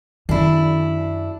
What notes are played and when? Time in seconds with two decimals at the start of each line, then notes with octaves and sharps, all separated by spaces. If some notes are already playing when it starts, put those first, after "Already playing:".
0.29 F#2 D#3 D4 E4